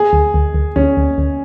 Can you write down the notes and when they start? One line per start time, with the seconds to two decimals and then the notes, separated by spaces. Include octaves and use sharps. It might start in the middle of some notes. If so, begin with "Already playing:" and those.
Already playing: G#4
0.13 D2
0.34 D2
0.54 D2
0.76 D2 C#4
0.97 D2
1.18 D2